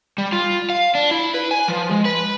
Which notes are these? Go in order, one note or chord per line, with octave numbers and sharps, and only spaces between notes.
G3
F4
F5
D4
E4
B4
G#5
F3
G#3
B4